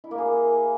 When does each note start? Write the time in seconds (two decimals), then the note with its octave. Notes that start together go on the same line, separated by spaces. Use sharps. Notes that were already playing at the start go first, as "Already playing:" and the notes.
0.04 E4
0.11 A#3
0.18 G#4